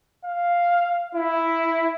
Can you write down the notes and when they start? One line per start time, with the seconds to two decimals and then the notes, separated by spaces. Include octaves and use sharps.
0.25 F5
1.15 E4